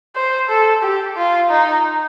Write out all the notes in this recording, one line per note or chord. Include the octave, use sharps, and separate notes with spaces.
C5
A4
G4
F4
D#4